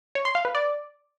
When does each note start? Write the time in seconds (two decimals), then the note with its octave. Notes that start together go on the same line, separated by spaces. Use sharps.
0.15 C#5
0.25 C6
0.35 F5
0.45 B4
0.55 D5